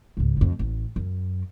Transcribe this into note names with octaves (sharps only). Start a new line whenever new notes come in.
C#2 G#2
F2 A2
A1
F#2